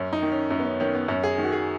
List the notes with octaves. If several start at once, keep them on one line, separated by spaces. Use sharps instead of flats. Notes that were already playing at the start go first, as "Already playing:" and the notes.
Already playing: F#2 C#4
D#4
D#3
C#4
F#2 C#4
B3
C#4
D#3 C#4
B3
F#2 C#4
G#4
D#3
F#4
G#4